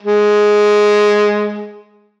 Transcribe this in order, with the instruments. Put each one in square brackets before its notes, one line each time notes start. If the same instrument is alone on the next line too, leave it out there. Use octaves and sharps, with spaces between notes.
[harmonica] G#3